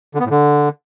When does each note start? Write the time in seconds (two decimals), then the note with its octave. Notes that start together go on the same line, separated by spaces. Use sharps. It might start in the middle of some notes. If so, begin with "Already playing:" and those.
0.15 D3
0.20 B3
0.25 A2
0.31 D3